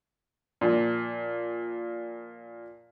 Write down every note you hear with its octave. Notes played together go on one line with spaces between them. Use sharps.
A#2 F3